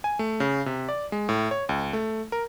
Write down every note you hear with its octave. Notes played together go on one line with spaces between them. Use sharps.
G#5
A3
C#3
C3
D5
G#3
A2
C#5
C#2
A3
A#4